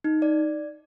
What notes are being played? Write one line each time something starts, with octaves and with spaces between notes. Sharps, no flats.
D#4
D5